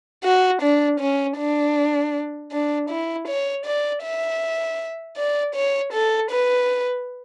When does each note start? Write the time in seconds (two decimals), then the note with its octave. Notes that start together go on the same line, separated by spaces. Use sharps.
0.24 F#4
0.62 D4
1.00 C#4
1.38 D4
2.52 D4
2.90 E4
3.28 C#5
3.66 D5
4.04 E5
5.17 D5
5.55 C#5
5.93 A4
6.31 B4